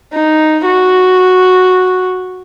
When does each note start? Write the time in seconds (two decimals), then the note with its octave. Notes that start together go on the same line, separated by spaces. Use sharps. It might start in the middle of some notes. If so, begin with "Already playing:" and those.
0.13 D#4
0.66 F#4